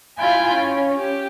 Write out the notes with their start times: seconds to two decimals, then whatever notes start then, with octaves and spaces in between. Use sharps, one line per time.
0.19 E4 F4 G5 G#5 B5
0.54 C#4
0.95 G4